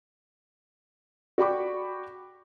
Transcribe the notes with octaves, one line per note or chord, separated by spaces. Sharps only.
F#4 D5 G5 B5 C#6 D6